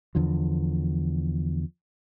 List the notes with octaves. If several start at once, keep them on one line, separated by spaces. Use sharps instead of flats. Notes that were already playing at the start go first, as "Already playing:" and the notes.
E2 D3 F3